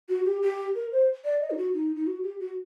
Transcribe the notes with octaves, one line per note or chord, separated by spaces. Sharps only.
F#4
G4
G4
A#4
C5
D5
D#5
D#4
F#4
D#4
D#4
F#4
G4
F#4